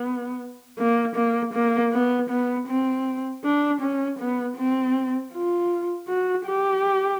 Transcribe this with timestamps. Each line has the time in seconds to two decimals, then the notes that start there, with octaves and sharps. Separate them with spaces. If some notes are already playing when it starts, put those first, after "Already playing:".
Already playing: B3
0.79 A#3
1.16 A#3
1.54 A#3
1.93 B3
2.30 B3
2.68 C4
3.44 D4
3.81 C#4
4.19 B3
4.57 C4
5.33 F4
6.08 F#4
6.46 G4